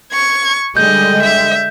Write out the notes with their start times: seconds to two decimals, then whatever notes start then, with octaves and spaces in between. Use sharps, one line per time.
0.13 C#6 G#6
0.77 D3 G3 G#3 D#5 G6
1.22 E5